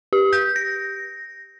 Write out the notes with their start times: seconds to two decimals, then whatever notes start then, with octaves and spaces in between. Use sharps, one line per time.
0.13 G4
0.33 G6
0.56 A#6